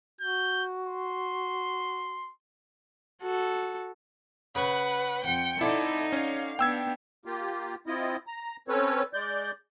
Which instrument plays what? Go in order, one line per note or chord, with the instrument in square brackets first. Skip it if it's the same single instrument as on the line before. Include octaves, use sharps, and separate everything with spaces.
[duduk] F#4 [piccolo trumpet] G6
[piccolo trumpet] C6
[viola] F#4 A4
[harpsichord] C#3 C#6 [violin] B4 F#5
[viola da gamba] F2 [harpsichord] F#5 [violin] G5 C#7
[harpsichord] D3 C4 D5 [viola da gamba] D#4 [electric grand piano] E4 [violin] A4
[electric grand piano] C#4 C#5 [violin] F5
[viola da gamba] B3 D4 [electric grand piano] G5 E6 G#6
[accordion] A#3 F4 G4
C4 E4 F4 D#5
A#5
C4 C#4 A4 B4 C#5
G#3 D5 G6